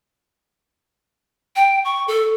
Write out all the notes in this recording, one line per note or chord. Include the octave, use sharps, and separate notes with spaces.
G5
C#6
A4